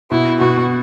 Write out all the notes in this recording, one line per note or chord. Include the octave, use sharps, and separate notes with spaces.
B2 E4
B2 F#4
B2